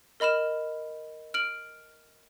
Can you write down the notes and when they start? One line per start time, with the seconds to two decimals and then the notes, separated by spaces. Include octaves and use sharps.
0.20 A#4 D#5 B5 F6 E7
1.34 F6 D7 F#7